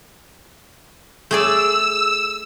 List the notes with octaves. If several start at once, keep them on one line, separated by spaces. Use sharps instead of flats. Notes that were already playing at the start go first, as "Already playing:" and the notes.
A3 G#4 D5 E6